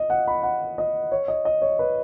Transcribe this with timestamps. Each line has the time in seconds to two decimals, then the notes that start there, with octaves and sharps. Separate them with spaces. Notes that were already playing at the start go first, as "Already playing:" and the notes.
Already playing: D#5
0.10 F#5
0.28 B5
0.43 F#5
0.78 D#5
1.12 C#5
1.28 D#5
1.45 D#5
1.62 C#5
1.79 B4